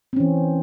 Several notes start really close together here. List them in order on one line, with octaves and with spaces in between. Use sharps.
C4 C#4 E3